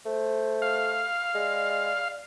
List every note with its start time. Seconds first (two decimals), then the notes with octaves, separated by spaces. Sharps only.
0.06 A3 C5
0.62 F5
1.35 G#3 D5